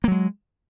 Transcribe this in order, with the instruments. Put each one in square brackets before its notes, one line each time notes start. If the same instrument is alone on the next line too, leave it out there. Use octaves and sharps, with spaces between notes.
[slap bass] A#3
F#3
G#3